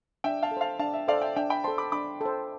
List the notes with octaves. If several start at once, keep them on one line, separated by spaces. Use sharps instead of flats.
D4 E5 G5
F5 A5
A4
C5 F5 A5
D4 F5 A5
E5
A4 C5 D5 F5
E5 G5
D4 E5 G5
G5 B5
A4 C5 A5 C6
B5 D6
D4 B5 D6
A4 C5